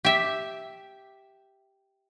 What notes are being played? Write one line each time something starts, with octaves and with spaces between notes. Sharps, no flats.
G4 E5